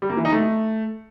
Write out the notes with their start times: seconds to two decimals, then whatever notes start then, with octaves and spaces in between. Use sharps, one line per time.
0.02 G3
0.10 A#3
0.17 E3
0.25 D#4
0.32 A3